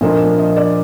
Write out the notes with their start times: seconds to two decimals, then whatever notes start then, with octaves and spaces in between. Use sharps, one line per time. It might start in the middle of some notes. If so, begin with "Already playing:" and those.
0.01 A#2 F3 A#3 D4 F4 D#5
0.38 D#5
0.56 D5